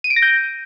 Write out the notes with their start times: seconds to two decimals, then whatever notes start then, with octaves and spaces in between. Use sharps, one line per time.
0.04 D#7
0.10 D7
0.16 A#6
0.22 G6